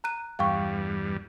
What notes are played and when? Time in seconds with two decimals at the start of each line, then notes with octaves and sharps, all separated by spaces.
0.04 A#5 F#6 D#7
0.39 E2 G2 G3 F5 G5 C#6